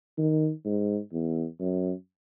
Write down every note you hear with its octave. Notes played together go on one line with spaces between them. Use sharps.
D#3
G#2
E2
F#2